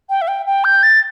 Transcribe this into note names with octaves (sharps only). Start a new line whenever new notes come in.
G5
E5
G5
G5
G6
A6